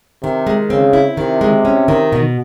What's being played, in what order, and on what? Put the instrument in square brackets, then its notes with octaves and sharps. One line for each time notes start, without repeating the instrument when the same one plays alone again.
[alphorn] C3 [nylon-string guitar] D#3
[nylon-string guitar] G#3
[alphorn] C#3 [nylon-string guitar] C4
[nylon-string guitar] E4
[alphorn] C3 [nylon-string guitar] D#3
[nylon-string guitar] G#3
C#4
D#3
B2